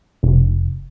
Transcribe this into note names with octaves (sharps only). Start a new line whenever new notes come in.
F1